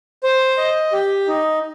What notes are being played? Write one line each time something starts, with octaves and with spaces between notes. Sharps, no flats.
C5
D#5
G4
D#4